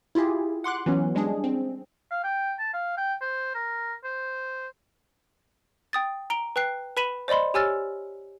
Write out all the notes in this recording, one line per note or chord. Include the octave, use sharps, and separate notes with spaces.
E4 F4 G4 G#4
F#5 C6 D6 F#6
E3 F#3 B3 C#4
G3 G#3 D4 G#4
C4
F5
G5
A5
F5
G5
C5
A#4
C5
G5 D#6 A6
A#5 D7 G7
B4 G5 F#6 C7
B4 B5 B6 D#7 E7 F#7
C5 D5 D#5 B5 C6
G4 C#5 G#5 E6 F6 A6